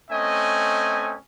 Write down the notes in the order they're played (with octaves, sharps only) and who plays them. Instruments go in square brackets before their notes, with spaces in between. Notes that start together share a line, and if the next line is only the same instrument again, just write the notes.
[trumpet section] A3 C4 C#4 D#5 G#5